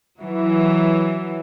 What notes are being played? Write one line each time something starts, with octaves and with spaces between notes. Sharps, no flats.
E3 F#3